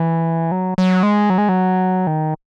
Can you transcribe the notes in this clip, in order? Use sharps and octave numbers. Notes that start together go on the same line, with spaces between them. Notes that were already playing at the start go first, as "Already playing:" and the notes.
Already playing: E3
F#3
F#3
G#3
F#3
G#3
F#3
D#3